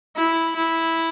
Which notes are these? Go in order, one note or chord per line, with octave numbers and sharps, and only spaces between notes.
E4
E4